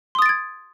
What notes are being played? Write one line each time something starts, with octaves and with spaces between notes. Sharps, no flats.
C6 D#6 G#6 A6 D7